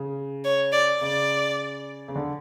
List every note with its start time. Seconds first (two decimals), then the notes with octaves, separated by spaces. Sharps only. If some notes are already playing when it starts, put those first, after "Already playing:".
Already playing: C#3
0.44 C#5
0.72 D5
1.01 C#3 D5
2.08 C#3
2.16 D3